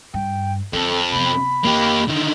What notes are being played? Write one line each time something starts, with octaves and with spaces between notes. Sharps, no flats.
G2 G5
F2 D3 A4
C3 B3 B5
F2 A#3 G4
D3 D#3